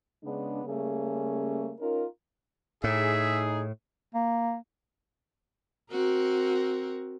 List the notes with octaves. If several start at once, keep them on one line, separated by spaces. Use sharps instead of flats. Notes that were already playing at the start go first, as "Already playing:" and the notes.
C#3 G#3 B3 D4
C#3 G3 A3 A#3 C#4 G#4
C#4 D#4 F4 A#4
A2 D#4 G#4 E5
A#3
C4 F#4 A#4